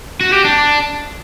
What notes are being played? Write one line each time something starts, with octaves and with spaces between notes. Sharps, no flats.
F#4
G4
D4